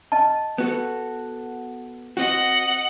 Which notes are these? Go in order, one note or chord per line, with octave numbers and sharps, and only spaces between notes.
D#5 A5
B3 F#4 A4
C4 F#4 D#5 F#5